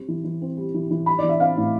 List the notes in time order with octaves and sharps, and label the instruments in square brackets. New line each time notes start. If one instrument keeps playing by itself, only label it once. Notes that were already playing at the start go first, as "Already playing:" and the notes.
Already playing: [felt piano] G3 C4
E3
E3
C4
G3
E3
E3
G3 B5
E3 D5
E5
C4 F5
A2